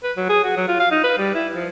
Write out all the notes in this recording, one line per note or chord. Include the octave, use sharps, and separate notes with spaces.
B4
F#3
G#4
F#4
F#3
F4
F5
D#4
B4
G3
E4
F3